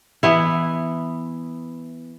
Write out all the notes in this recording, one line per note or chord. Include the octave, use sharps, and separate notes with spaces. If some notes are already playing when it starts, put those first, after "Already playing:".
E3 B3 E4